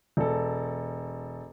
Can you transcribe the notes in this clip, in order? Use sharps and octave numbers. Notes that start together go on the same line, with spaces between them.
E1 A4